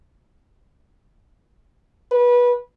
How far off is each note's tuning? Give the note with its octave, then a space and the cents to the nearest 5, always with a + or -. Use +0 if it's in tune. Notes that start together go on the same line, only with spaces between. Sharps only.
B4 -20